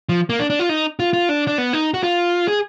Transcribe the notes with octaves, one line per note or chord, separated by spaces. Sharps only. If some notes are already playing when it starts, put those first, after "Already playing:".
F3
A#3
D4
D4
F4
D#4
F4
F4
D4
D4
B3
D#4
F#4
F4
G#4